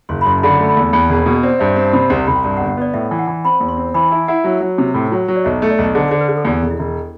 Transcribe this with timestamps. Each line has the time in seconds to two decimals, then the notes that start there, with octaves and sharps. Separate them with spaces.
0.09 F#1 C6
0.21 B5
0.26 F#2 C6
0.38 A5
0.43 D3 B5
0.59 A3
0.68 B5
0.77 E2
0.93 E2 B5
1.05 E1 A5
1.18 C5
1.26 B2
1.43 C4 D5
1.59 G2 E5
1.76 C4 E5
1.86 A5
1.93 C3 B5
2.10 C2 C6
2.27 C2 B5
2.36 G5
2.43 G2 A5
2.57 F#5
2.60 G1
2.69 F#5
2.77 B3 D5
2.94 A2 E5
3.11 E3
3.19 F#5
3.27 E3
3.44 C4 B5
3.60 E2
3.68 C6
3.77 C4
3.94 E3 B5
4.11 E4 A5
4.28 E4 F#5
4.44 F#3
4.61 F#3
4.78 C3
4.94 A2
5.12 F#3
5.28 F#3
5.36 D5
5.44 B1 E5
5.62 A3
5.70 D5
5.78 B1
5.95 D3 C5
6.08 D3 C5
6.21 B4
6.28 D3
6.37 A4
6.45 E2 G4
6.62 E1
6.71 E4
6.79 E1